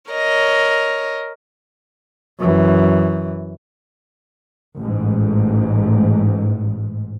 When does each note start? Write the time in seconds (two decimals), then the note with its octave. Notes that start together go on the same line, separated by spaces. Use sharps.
0.11 A#4 C#5 D#5
2.40 F#2 E3
4.77 A1 G#2